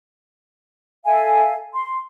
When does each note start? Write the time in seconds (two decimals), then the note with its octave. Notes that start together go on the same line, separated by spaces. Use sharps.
1.05 A4 E5 F5 G#5
1.74 C6